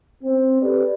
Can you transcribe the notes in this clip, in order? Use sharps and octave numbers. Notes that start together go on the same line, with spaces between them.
C4
G4 A4 B4 D5